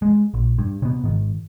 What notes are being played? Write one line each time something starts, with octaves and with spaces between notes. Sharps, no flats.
G#3
A#1
G2
C3 B3
G#2 D#3